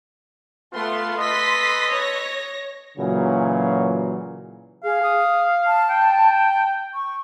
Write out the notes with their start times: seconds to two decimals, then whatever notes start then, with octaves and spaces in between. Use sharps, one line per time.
0.73 A3 B3 F4 A4 C6
1.19 A4 B4 D#5 C6 B6
1.90 C#5 A#6
2.98 A#2 C#3 E3 F#3
4.84 G#4 F5
5.03 D#6
5.66 A5
5.90 G5
6.94 C#6